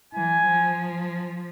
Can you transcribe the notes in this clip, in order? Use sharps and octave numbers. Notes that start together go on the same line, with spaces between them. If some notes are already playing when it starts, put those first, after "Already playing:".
E3 G#5
F3